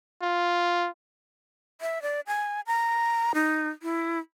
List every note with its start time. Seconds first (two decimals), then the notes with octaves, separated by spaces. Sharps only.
0.22 F4
1.81 E5
2.02 D5
2.27 G#5
2.67 A#5
3.35 D#4
3.83 E4